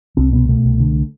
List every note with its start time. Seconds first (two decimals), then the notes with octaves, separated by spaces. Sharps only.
0.17 C2 C4
0.32 B2 B3
0.49 B2 A3
0.64 C2
0.80 D3